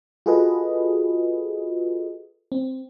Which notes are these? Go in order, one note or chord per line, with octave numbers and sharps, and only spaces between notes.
F4 F#4 G#4 A4 B4 D#5
C4